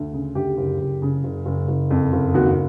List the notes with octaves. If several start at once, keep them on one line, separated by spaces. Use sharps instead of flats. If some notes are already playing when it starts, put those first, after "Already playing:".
Already playing: D2
C#3
D2 G4
F#1
F#1
C#3
F#1
F#1
F#1
F2
F#1
D#2 F#4